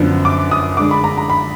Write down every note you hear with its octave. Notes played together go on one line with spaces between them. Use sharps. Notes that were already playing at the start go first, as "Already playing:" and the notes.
Already playing: F#2 D3 F3 B3 D4
D6
D#6
D3 G#3 D4 D6
B5
A#5
A#5
B5